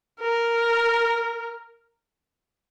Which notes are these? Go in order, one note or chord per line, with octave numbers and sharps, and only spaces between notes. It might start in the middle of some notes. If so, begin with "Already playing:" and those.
A#4